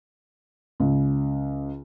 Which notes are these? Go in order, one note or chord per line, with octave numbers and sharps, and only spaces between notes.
C#2